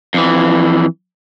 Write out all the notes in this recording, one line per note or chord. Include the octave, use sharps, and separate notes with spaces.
F2 E3